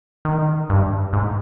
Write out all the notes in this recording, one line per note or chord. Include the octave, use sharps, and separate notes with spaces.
D#3
G2
G#2